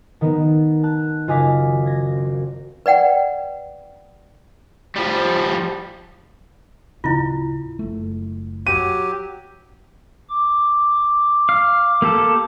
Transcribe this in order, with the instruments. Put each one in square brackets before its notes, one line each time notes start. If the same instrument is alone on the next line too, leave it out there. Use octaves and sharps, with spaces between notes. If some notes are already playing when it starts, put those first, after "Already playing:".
[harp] D#3 B3 D#4
A5 F#6
F#1 F4 D#5 G#5 D6 B6
G#6 A#6
C4
[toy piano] B4 D5 F#5 G5
[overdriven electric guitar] F3 G3
[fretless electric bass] D1 C#3 C4 [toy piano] E4 F4
[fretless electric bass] F#1 A3
[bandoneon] F#3 G4 [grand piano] D#7
[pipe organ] D6
[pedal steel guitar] F5
A#3 G4 A4